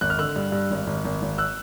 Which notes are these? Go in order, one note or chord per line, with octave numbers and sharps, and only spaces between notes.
G#1 F#6
F6
D3 E6 F#6
G2
G2
G#1
G#1
G#1
G#1
E6 F#6